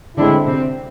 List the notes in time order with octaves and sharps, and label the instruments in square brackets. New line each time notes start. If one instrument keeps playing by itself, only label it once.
[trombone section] A2 G#3 C4 E4 [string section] D3 D4
[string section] C3 C4